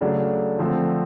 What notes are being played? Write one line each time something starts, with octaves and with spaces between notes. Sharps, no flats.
C#3 F#3 A3 D4
D3 F3 A3 C4